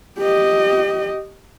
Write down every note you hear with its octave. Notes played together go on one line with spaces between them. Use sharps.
G4 D#5